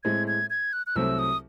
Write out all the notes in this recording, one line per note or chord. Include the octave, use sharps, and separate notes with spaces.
A2 G#3 C4 G#6
G#6
G#6
F#6
F#6
C2 C3 F#3 A3 C4 E6
D#6